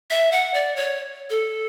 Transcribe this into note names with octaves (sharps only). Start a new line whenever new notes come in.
E5
F#5
D5
C#5
A4